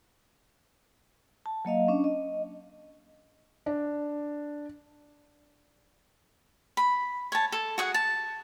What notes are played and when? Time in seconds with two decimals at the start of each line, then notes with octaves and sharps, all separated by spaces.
1.46 A5
1.65 F#3 A#3 D#5 F5
1.88 C#4 D4
2.04 D#5
3.66 D4
6.77 B5
7.32 C#5 A5
7.52 A4
7.78 F#4 G#4 F#5
7.94 A5